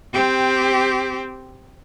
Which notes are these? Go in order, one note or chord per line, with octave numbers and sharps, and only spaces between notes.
C4 G4